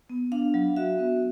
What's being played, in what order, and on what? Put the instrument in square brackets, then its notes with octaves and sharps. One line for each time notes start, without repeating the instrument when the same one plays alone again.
[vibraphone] B3
D4 F5
F#3
F#4 E5
B3